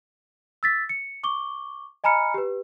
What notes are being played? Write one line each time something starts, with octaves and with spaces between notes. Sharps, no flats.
E6 A6 B6
C#7
C#6 D6 G7
D#5 G#5 A#5 B5 F6 C#7
G4 B4